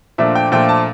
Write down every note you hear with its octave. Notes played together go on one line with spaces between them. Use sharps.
A#2 F3 A3 D4 E5
G5
A#2 F3 A3 D4 G5
A5